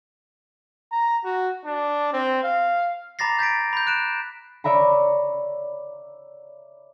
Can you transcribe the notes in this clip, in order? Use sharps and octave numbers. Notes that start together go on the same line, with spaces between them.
A#5
F#4
D4
C4
F5
A#5 B5 D6 A6 A#6 C7
G6 A6 B6 D7
B5 G6
F#6 D7 E7
C#5 D5 E5 A#5 B5